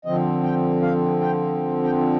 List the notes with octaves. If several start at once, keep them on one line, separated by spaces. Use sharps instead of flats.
D3 F3 C4 D#5
G5
F5
G5
G5